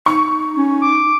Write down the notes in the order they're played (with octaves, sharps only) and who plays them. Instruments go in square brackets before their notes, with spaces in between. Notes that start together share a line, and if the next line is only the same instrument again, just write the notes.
[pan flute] D#4 [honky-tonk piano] C#6
[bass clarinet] C#4
[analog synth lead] D6